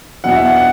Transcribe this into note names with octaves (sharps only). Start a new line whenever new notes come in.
E2 B2 F#3 F#5
E5
F#5
F#5